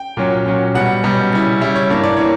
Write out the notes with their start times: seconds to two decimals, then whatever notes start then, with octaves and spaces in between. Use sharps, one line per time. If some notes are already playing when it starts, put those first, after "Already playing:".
Already playing: G5
0.17 A#2 F#3 C#4
0.46 A#2 F#3 C#4
0.75 B2 G3 C#4 F#5
1.04 B2 G3 C#4
1.33 C#3 G3 C#4 E4
1.61 C#3 G3 C#4 E4 E5
1.76 C#5
1.90 G2 E3 A#3 D4 C#5
2.04 D5
2.17 E3 A#3 C#5